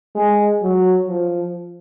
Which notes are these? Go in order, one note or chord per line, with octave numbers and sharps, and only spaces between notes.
G#3
F#3
F3